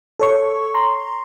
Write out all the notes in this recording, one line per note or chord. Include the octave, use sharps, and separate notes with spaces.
A4 C#5 C#6
A#5 C6